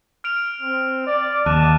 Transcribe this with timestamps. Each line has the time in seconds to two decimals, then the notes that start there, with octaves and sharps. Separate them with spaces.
0.24 F6 D7 F7
0.62 C4
1.07 D5
1.46 D#2 A5 D6 F#6 D#7